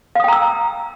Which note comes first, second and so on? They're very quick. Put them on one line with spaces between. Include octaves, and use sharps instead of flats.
F5 D#6 G5 A#5 E6